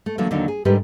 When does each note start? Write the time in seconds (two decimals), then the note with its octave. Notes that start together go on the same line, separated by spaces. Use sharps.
0.06 A3
0.18 D3 E3 F#3 A3 A#3
0.31 D#2 D3 D#3 F#3 D#4
0.48 G#4
0.65 G#2 D3 G3 G4 A#4 B4